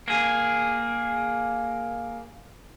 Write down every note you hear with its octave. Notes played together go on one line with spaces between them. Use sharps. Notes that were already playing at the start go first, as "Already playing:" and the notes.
A#3 G#4